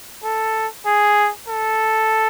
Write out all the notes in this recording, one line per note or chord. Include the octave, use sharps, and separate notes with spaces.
A4
G#4
A4